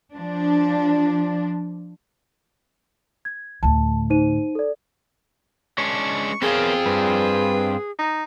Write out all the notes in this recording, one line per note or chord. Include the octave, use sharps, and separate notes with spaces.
F3 D4
G#6
D2 A2 A5
D#4 C5 D#7
A4 D5
G#3 C#4 D4 C#6
B3 C4 F4 G#4 A#4 C#5
G2 B4
D#4